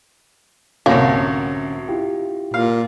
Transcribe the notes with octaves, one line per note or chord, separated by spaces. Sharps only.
C2 F#2 A2 D3 A#3 C#4 F#4
E4 F4 G4
A#2 F5